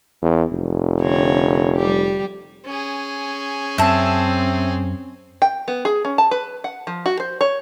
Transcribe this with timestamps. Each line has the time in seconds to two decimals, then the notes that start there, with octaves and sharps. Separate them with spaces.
0.22 E2
0.52 F1
1.01 D3 C4 C#5
1.76 G3 G4
2.65 C#4 G#4
3.78 F#2 C4 E5 A5
5.42 G5
5.68 B3
5.85 G#4
6.05 C#4
6.18 A5
6.31 B4
6.64 F#5
6.87 F3
7.06 F#4
7.20 C5
7.41 C#5